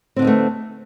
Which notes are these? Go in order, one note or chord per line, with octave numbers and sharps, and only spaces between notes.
D3 A3 B3 C4 D#4